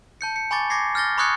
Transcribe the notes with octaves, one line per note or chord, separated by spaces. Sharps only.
A5 G6 C#7
C#7
G#5 B5 C#6 D6 A6
D6 G#6 A#6 C7
F6 G6 A6 A#6 G7
B5 C#6 D#6 F#6 G#6 C#7